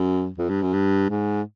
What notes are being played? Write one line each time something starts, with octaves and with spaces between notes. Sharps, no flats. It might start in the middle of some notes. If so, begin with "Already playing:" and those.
Already playing: F#2
F2
G2
F#2
G2
G#2